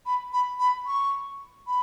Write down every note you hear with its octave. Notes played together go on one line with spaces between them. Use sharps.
B5
B5
B5
C#6
B5